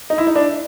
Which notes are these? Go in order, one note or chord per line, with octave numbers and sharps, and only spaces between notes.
D#4
E4
D#4
D4